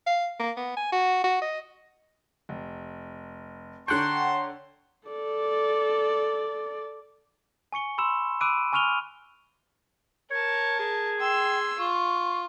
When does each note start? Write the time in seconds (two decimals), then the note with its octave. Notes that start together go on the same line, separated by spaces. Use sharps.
0.06 F5
0.39 A#3
0.57 B3
0.77 G#5
0.92 F#4
1.24 F#4
1.41 D#5
2.49 F1
3.88 D3 C#5 F#5 G5 A5 A#5 C6 C#6
5.09 A4 D5
7.72 G#5 C#6 C#7 G7
7.98 B5 C6 E6 E7
8.41 B5 D6 E6 F#6 D7 D#7
8.73 G#5 C#6 F6 D#7 F7 G7
10.31 A#4 C#5 A5
10.79 G#4
11.20 G5 C6 E6
11.79 F4 C#6